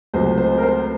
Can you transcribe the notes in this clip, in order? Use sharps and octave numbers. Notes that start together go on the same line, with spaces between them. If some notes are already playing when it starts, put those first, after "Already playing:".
C#2 C3 F#3 A3 C5
C5
A#4
C5